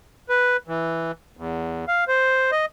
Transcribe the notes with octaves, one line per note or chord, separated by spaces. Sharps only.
B4
E3
E2
F5
C5
D#5